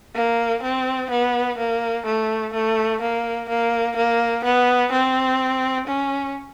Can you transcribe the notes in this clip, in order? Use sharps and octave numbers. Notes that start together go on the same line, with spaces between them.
A#3
C4
B3
A#3
A3
A3
A#3
A#3
A#3
B3
C4
C#4